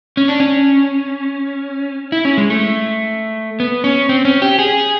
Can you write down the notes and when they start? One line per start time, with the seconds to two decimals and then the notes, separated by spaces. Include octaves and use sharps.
0.17 C#4
0.28 D4
0.40 C#4
2.12 E4
2.25 C#4
2.38 G#3
2.50 A3
3.60 B3
3.84 C#4
4.09 C4
4.25 C#4
4.42 G4
4.59 G#4